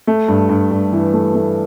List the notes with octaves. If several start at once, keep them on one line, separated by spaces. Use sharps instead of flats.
A3
G2
G2
G2
E3
A3
A3